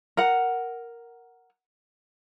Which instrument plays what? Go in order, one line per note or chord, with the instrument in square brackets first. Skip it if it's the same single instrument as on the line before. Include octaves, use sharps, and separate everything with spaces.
[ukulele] A#4 F#5